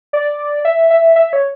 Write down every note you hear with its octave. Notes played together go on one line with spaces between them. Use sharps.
D5
E5
E5
E5
C#5